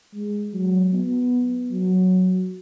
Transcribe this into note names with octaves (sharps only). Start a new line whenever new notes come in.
G#3
F#3
B3
F#3